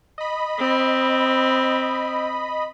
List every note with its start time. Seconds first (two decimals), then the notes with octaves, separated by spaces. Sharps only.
0.18 D#5 B5
0.59 C4